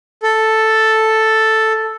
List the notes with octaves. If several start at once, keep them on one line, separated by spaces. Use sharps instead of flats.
A4